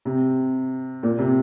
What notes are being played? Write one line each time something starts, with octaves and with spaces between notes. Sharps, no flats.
C3
A#2
C3